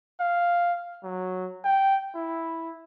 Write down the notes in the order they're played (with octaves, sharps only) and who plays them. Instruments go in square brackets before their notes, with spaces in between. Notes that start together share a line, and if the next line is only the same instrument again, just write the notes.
[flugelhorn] F5
F#3
G5
E4